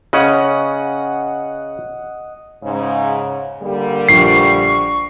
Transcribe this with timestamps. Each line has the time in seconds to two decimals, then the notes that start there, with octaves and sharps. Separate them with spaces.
0.13 C#3 C#4 D#5 F#5
2.63 G#2 C#3
3.62 D3 G3 A#3
4.09 A#1 F3 C#6 C7